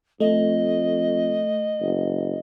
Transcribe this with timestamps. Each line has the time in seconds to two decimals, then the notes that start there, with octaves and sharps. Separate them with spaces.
0.20 F2 A3 D#5
1.81 F#1